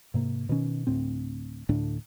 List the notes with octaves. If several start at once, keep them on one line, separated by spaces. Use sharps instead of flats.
G#2 C3 A#3
B2 D#3 C#4
D2 A2 C4
D2 A2 A3 D4